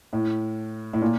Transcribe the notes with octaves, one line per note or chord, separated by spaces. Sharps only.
A2
A2
A#2